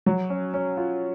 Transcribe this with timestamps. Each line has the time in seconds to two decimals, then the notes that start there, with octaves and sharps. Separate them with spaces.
0.06 F#3
0.30 C#4
0.54 C#4
0.77 F4